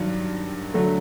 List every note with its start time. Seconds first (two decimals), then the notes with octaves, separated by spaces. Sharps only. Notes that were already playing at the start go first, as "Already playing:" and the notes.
Already playing: G2 D#3 F#3
0.74 D3 F#3 A3